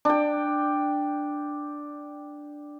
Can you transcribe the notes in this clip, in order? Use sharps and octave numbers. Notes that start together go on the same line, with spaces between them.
D4 G5